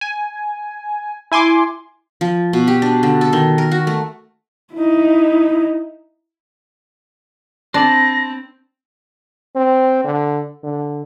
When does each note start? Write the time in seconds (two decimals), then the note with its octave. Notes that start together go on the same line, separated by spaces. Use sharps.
0.01 G#5
1.32 E4 G#5 C6 D6
2.21 F3
2.53 B2
2.68 G4
2.82 D4
3.03 D3
3.21 A4
3.33 D#3
3.58 A#4
3.72 F#4
3.87 A3
4.74 D#4 E4
7.74 C4 D4 C5 A5 B5 A#6
9.56 C4
10.04 D3
10.63 D3